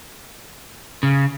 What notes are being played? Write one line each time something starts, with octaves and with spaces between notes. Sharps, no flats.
C#3